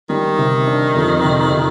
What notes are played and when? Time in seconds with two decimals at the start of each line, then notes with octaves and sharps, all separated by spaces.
0.09 D#3 G3
0.38 C3
0.67 D4
0.95 F2
1.24 C3
1.52 C3